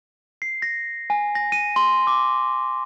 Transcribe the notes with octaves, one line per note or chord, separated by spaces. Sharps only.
C7
A#6
G#5
A#6
D#7
C6
D6